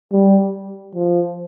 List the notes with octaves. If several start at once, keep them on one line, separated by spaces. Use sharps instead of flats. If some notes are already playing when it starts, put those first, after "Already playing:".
G3
F3